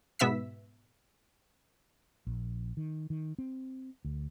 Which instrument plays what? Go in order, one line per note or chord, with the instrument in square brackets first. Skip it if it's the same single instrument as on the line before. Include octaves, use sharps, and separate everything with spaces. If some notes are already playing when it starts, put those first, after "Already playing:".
[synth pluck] G#2 B2 B3 E5 E6 B6
[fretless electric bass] A#1
D#3
D#3
C4
D2